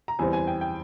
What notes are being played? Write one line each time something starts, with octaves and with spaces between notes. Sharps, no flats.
A#5
E2 E3 G3 C4 G#5
G#5
G5
G5